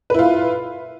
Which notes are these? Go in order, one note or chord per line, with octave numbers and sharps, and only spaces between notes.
E4 F4 B4